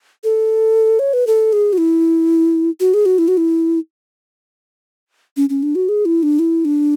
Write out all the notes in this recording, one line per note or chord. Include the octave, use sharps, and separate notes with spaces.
A4
C#5
B4
A4
G#4
F#4
E4
F#4
G#4
F#4
E4
F#4
E4
C#4
C#4
D4
F#4
G#4
E4
D4
E4
D4